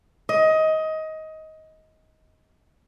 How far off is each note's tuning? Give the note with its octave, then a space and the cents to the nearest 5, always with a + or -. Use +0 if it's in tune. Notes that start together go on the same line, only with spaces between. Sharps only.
D#5 +20